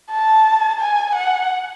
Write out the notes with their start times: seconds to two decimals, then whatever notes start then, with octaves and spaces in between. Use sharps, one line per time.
0.10 A5
0.80 G#5
1.15 F#5